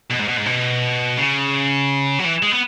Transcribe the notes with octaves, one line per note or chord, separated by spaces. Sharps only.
B2
G#2
B2
G#2
B2
C#3
F#3
E3
G#3
B3